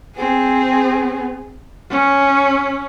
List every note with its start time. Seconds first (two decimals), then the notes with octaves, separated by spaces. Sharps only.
0.17 C4 G#4
1.91 C#4